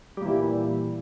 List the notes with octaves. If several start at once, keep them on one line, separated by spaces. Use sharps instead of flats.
A#2 E3 G3